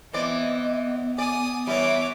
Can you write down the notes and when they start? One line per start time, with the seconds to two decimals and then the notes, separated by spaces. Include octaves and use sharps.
0.13 E3 B3 C4 D5 D#5
1.18 D5 G#5 D#6
1.67 E3 G3 C#5 E5 D6